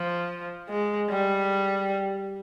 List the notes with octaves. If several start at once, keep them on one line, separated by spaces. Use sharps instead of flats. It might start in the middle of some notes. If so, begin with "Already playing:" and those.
Already playing: F3
G#3
G3